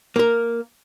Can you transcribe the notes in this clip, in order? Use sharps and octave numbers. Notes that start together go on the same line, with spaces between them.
A#3 A#4